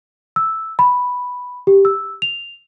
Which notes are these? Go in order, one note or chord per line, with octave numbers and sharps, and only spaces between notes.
E6
B5
G4
E6
F7